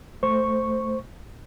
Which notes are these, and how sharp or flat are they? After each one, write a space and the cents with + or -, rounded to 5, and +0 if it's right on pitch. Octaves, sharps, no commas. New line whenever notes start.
A3 +0 C5 +0 C#6 -5